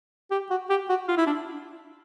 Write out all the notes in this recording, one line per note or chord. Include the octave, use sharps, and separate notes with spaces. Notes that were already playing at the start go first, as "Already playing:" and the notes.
G4
F#4
G4
F#4
F4
E4
D4